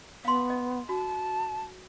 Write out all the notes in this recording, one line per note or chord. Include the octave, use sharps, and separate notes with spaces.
B3 F5 C6
D#5
F#4 A5